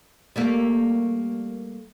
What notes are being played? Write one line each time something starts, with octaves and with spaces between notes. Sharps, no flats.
G3 A3 A#3